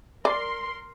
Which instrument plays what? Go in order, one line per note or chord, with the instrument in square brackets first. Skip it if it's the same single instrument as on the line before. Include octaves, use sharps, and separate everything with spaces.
[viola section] A#4 C6 [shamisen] D5